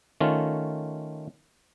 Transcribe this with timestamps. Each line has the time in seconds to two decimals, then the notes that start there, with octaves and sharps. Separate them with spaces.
0.20 D#3 A3 C#4 F4